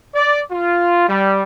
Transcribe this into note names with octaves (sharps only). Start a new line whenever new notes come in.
D5
F4
G3